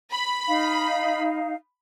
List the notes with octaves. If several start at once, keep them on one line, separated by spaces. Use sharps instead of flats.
B5
D#4 F5